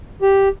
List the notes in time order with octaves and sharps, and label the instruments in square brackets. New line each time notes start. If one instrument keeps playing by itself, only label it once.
[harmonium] G4